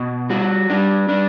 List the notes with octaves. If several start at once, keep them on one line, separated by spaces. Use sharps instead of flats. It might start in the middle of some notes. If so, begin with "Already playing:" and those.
Already playing: B2 F#4
G3 F#4
G3 D4
G3 D4